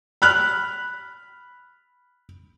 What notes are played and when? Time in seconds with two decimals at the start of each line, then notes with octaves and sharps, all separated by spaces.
0.22 B5 F6 F#6